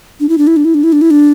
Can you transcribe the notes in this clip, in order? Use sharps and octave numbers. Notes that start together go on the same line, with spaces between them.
D4
E4
D4
E4
D4
E4
D4
E4
D4
E4
D4